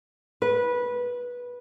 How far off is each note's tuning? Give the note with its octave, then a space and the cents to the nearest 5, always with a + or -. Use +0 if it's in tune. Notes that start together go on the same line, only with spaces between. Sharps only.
B4 -15